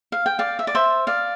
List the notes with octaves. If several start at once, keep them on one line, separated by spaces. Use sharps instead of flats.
F5
G5
D5 F5
E5
D5
C5 E5
D5 F5